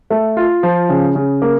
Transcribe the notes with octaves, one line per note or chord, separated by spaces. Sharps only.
A3
F4
F3
C#3
C#3
A#3